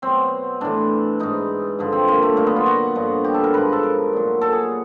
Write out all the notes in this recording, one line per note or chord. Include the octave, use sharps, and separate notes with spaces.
B2 F#3 C4
A2 E3 D4
G#2 E3 D#4
G2 D3 F3
C4
A#3
A3
A#2 F#3 A#3
B3
F4
F#4
G2 D3 F3
G4
A4
A#4
G#2 F3 B4
A4
A#4
A#2 F#3
A4
G#4